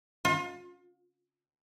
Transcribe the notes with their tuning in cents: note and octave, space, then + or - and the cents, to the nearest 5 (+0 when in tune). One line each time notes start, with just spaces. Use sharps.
F4 +35